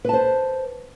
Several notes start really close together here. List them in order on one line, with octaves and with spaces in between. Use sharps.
B4 A5 C5